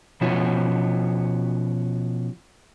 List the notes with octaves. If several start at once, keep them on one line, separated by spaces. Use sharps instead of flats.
B2 F3 C#4 E4 F#4